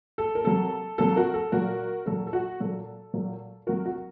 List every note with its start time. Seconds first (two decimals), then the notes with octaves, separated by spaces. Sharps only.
0.18 A4
0.35 A#4
0.44 C3 F#3 A#3 A4
0.98 C3 F#3 A#3 A4
1.16 F#4 A#4
1.34 A4
1.52 A#2 F#3 A#3 F#4 A#4
2.06 A#2 F#3 A#3 A4
2.27 A4
2.33 F#4
2.60 A#2 F#3 A#3 A4
3.14 A#2 F#3 A#3
3.67 C3 F#3 A3 F#4 A#4
3.86 F#4